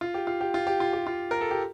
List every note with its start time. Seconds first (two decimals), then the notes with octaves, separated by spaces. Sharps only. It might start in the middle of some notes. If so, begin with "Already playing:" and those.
0.01 F4
0.14 G4
0.27 F4
0.41 G4
0.54 F4
0.67 G4
0.80 F4
0.93 G4
1.07 F4
1.31 A#4
1.41 A4
1.51 G4